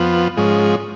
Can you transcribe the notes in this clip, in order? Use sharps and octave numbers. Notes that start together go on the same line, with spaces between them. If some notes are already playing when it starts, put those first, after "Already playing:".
Already playing: F2 F3 B3
G#2 F3 G#3 C#4